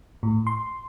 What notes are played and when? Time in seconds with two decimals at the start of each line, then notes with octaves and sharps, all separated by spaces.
0.23 A2
0.47 C6